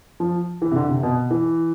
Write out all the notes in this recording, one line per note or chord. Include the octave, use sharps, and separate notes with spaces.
F3
E3
C3
D3
C3
B2
E3